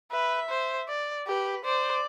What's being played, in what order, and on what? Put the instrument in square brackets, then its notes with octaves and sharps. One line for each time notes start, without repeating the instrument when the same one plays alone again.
[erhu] B4 [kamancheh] E5
[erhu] C5
D5
[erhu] G4 [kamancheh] B4
[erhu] C5 [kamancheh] D5